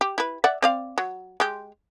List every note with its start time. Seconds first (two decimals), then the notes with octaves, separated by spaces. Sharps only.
0.01 G4
0.18 E4 B4
0.44 D5 E5 F#5
0.62 C4 D5 F5
0.98 F#3
1.40 G#3 G4